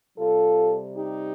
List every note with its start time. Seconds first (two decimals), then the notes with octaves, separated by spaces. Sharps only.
0.18 C3 G3 F4 A4
0.95 D#4 G4